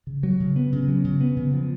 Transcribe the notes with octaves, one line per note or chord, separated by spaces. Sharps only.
C#3
F#3
C#3
B3
C#3
F#3
C#3
B3
C#3
F3